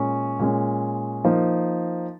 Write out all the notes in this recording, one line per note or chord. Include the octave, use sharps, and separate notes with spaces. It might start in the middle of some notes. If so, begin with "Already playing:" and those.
Already playing: A#2 G#3 C#4
A#2 G#3 C#4
F3 A#3 D#4 A#4